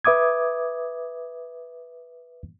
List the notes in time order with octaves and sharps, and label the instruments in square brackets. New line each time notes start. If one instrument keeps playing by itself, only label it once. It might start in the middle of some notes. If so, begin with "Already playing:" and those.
[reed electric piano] B4 E5 D6 D#6 G#6